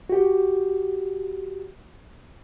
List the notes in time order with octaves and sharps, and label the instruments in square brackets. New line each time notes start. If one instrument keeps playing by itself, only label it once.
[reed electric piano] F#4 G4